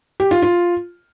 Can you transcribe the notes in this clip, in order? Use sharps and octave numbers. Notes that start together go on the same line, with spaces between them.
G4
F4
F4